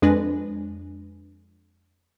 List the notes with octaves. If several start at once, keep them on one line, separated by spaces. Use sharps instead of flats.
F2 G#3 D4 B4 G#5 A#6